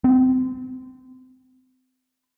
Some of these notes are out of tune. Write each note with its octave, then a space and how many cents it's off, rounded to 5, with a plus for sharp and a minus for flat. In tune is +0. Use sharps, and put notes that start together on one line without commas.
C4 -30